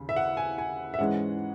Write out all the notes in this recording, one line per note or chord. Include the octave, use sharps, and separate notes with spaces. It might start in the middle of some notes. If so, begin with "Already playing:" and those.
Already playing: D#2 C#3
E5
F#5
G#5
G#5
E5
G#2 E3 G#3 C#4 F#5